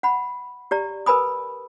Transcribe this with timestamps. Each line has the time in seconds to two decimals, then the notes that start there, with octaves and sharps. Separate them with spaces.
0.03 F#5 B5
0.71 G4 D5 A#5
1.06 A#4 B4 G#5 B5 D#6